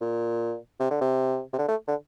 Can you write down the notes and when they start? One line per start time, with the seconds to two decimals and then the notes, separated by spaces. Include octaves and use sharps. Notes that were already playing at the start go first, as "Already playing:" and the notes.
0.01 A#2
0.80 C3
0.90 D3
1.01 C3
1.53 C3
1.58 D3
1.68 A3
1.88 D3